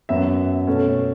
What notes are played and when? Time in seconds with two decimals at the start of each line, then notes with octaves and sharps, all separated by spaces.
0.09 F#2 F#3 B3 E5
0.67 B2 A3 C#4